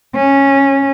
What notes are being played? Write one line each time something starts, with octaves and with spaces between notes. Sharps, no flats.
C#4